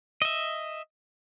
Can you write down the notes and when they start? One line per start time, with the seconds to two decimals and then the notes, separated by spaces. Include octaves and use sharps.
0.22 D#5 E5